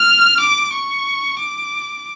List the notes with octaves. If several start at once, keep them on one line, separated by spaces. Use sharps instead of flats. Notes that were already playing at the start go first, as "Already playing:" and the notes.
Already playing: F6
D6
C#6
D6